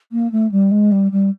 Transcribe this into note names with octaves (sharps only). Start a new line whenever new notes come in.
A#3
A3
G3
G#3
G3
G3